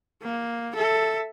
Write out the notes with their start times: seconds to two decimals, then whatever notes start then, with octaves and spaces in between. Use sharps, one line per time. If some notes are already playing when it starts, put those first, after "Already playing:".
0.22 A#3
0.75 A4 E5